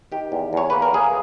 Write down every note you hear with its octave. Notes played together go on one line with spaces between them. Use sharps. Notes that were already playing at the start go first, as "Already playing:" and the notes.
D#3 G4
E2
E2 C#5
A#3 B4
A#4
A#3 G#4